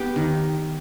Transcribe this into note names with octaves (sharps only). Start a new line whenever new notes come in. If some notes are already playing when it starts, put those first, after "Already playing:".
Already playing: B3 G4
D#3